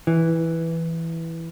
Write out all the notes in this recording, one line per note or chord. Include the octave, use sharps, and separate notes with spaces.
E3